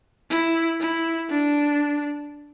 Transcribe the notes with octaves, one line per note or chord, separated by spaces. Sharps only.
E4
E4
D4